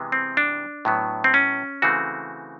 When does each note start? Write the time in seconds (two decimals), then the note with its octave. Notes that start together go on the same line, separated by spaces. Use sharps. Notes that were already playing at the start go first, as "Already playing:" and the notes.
Already playing: C3 E3 G#3 B3
0.12 C4
0.37 D4
0.85 A2 F#3 B3
1.24 C4
1.34 C#4
1.82 C#3 E3 A3 C4 F#4